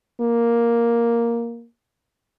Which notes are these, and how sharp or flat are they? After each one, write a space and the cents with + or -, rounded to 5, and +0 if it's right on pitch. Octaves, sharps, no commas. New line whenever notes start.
A#3 +5